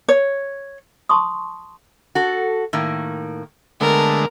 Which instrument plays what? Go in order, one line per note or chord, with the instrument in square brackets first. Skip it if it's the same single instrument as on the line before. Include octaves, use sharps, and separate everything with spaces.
[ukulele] C#5
[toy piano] A5 C6 C#6 D#6
[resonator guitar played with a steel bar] F#4 A4
A2 D#3 A#3
[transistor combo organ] D3 G#3 A3 [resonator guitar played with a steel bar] B3 [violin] A#4